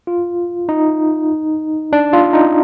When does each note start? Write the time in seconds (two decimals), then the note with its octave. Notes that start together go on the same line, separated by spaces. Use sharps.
0.07 F4
0.69 D#4
1.93 D4
2.13 F4
2.33 D#4